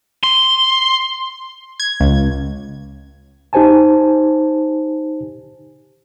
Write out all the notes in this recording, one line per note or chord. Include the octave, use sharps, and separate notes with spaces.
C6
G#6
C#2
D#4 G4 C5 G#5 A5